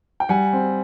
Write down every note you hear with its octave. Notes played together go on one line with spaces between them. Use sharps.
G5
G3 F#5 G#5
C4